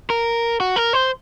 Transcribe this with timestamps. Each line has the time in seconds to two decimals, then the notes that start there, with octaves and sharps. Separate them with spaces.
0.10 A#4
0.60 F#4
0.76 A#4
0.93 C5